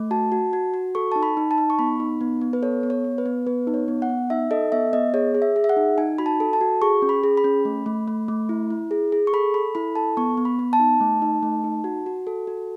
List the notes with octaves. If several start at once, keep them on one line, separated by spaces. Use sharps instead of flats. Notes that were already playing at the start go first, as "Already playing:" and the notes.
Already playing: A3
F#4 A5
F#4
F#4
F#4
A4 C#6
D#4 A5
B5
D#4
A5
D#4
C#6
B3 B5
D#4
B3
B3
B4
A4 C#5
B3
C#5
B3
B4
B3
B3 B4
D#4
C#5
B3
F#5
B3
D#4 E5
A4 D#5
B3 E5
B3 D#5
G#4 C#5
G#4
E5
G#4
E5
F#5
D#4
D#4 G#5
F#4 B5
A5
A4
A5
F#4
G#4 C#6
C#4
B5
G#4
B5
C#4
A3
A3
A3
A3
E4
E4
G#4
G#4
C#6
A4 B5
A4 B5
E4 B5
A4 A5
B3 C#6
B3
B5
B3
A5
D#4
A3
D#4
A3
D#4
F#4
F#4
A4
F#4